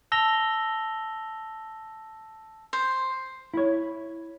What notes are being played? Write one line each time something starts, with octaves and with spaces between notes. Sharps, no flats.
A5 E6 A#6 F7 G7
C5
E4 C#5